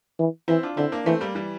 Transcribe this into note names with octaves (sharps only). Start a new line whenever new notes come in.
E3
E3 C4 E4
D4 F4
D3 C4 E4
A#3 D4
E3 A3 C4
G3 A#3
E3 G3